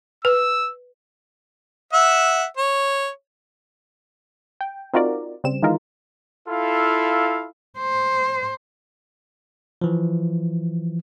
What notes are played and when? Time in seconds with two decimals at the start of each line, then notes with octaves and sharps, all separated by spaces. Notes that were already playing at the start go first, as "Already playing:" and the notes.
0.25 B4 E6
1.93 E5 F#5 E6
2.57 C#5
4.61 G5
4.94 C4 D#4 F4 F#4 A#4 D5
5.44 C#3 G3 C4 E7
5.62 D#3 E3 G#3 D#4 F4 A#4
6.48 E4 F4 A4 F5
7.79 C5
9.82 E3 F3